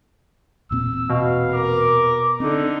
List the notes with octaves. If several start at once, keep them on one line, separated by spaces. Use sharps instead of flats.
E1 A#2 C4 E6
B2 F5
A#4 D6
D3 C4 D#4